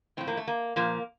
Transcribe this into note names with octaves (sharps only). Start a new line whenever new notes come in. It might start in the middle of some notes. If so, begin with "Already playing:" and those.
A2 F3 C4
A#3
A3
A#3
A#2 F3 A#3